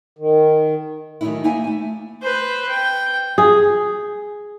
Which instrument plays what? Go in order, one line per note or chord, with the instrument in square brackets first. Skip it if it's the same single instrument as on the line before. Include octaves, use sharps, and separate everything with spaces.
[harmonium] D#3
[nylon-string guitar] D#3 E3 F#3 A3 D#4 E4
A#3 D#4 E4 E5 G#5
A3 G#5
[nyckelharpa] B4 C5
G5
[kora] G#4